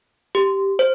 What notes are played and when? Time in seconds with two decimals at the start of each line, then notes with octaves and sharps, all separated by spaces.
0.35 G4
0.79 C5